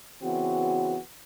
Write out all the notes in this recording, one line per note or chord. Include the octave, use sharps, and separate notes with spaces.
C#3 E3 B3 C4 F#4